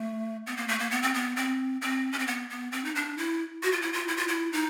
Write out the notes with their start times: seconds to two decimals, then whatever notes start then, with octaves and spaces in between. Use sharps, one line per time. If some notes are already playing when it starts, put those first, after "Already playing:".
Already playing: A3
0.47 B3
0.57 A#3
0.68 A3
0.79 A#3
0.91 B3
1.02 C4
1.14 B3
1.36 C4
1.81 C4
2.12 C#4
2.19 C4
2.27 B3
2.50 B3
2.72 C4
2.84 D#4
2.95 D4
3.18 E4
3.63 F#4
3.72 F4
3.82 E4
3.93 F4
4.08 E4
4.17 F4
4.28 E4
4.52 D#4